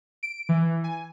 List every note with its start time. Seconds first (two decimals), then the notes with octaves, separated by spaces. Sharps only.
0.23 D7
0.49 E3
0.84 G#5